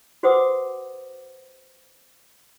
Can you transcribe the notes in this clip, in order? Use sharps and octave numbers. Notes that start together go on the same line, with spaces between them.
F#4 B4 C5 F#5 D6 D#6